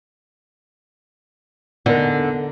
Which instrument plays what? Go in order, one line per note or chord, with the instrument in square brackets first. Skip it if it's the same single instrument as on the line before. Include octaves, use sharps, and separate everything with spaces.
[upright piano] E2 B3 D#4 [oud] D3 [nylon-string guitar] A4 A#4